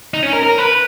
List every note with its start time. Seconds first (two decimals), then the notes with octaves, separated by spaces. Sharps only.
0.14 D#4
0.23 C#4
0.33 A#4
0.43 A#4
0.58 B4